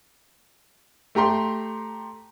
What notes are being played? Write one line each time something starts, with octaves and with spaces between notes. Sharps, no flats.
A3 G4 A#5 C6